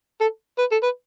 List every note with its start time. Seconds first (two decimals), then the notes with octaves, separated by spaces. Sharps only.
0.21 A4
0.59 B4
0.72 A4
0.83 B4